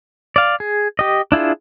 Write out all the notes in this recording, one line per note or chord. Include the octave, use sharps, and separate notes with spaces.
D5 F5
G#4
G4 D#5
D4 E4 F4 G#4